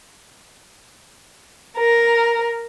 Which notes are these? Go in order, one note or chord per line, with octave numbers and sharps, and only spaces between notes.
A#4